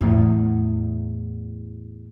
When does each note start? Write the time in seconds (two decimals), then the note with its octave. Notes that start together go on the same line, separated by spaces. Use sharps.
0.01 E2 A2